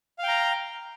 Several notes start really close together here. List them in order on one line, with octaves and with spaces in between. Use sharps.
F5 G5 A#5